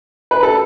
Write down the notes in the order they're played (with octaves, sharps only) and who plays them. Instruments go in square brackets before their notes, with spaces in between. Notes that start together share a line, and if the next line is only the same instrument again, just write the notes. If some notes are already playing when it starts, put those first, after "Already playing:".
[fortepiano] B4
A4